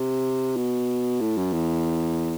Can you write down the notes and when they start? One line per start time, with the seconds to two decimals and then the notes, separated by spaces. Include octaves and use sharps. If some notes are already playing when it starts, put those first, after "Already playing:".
Already playing: C3
0.57 B2
1.21 A2
1.37 F#2
1.53 E2